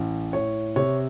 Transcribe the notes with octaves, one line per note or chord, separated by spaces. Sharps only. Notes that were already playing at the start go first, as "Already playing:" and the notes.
Already playing: A1
A2 C#5
C3 C#5